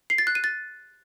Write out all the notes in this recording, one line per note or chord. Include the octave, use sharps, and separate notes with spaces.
C7
A6
F#6
D#7
A6